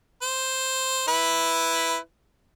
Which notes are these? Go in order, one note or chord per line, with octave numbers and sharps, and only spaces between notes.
C5
E4 B4